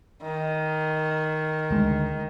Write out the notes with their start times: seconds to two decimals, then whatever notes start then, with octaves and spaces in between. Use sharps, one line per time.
0.23 D#3
1.71 D2 G#3